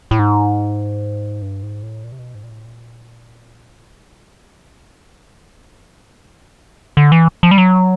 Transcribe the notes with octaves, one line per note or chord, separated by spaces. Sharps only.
A2
G#2
G2
G#2
A2
A#2
C3
B2
G#2
A#2
A2
A#2
C3
C#3
D3
E3
F3
G3
F#3